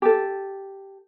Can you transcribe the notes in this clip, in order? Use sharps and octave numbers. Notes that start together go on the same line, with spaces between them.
G4 A4